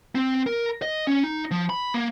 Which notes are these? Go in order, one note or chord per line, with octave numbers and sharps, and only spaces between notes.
C4
A#4
D#5
C#4
D#4
F3
B5
A#3